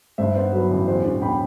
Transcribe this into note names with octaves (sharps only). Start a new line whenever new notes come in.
G2 C5 E5
B3 C5
F#3 B4
A1
E2 C5
E1
B2 G5 B5